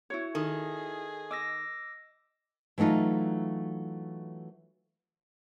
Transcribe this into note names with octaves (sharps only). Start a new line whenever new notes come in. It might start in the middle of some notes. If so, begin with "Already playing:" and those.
E4 F#4 C#5
D#3 G#4 A4
D#5 D6 E6 A#6
E3 F#3 A3 D#4 F4